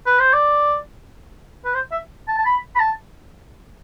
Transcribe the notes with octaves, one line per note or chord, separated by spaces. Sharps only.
B4
C5
D5
B4
C5
E5
A5
A5
B5
B5
A5